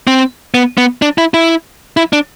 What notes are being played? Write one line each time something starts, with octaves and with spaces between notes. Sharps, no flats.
C4
B3
B3
D4
E4
E4
E4
D4